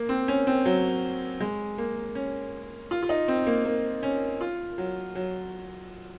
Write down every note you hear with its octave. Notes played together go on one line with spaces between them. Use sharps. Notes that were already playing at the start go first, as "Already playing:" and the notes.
Already playing: A#3
C4
C#4
C4
F#3
G#3
A#3
C#4
F4
F4
D#4
C4
A#3
A#3
C#4
F4
F#3
F#3